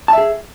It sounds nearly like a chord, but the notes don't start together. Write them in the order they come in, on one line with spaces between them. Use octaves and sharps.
A5 E5 G#4